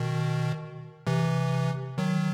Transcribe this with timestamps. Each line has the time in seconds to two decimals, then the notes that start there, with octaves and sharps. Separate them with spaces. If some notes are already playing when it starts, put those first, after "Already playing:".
Already playing: B2 D#3
1.07 C3 E3
1.98 D#3 F#3